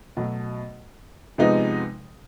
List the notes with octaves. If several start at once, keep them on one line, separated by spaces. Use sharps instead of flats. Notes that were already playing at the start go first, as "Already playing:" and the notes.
B2 F#3 A3
C3 F3 G#3 B3 D#4